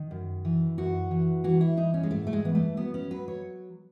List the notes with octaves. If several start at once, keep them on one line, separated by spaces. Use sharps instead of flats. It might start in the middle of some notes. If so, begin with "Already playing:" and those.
Already playing: D#3
F#2
E3
F#2 F#4
E3
E3 F#4
E4
E3 D#4
C#4
G#3
G#2 A3
A3
G#3
E3 B3
A3
F#3 B3
C#4
F#3 B4
C#5